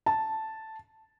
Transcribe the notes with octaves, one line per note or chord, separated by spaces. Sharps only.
A5